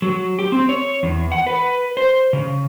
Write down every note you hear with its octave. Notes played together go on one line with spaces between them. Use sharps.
F#3
G4
C4
C#5
E2
F#5
B4
C5
C#3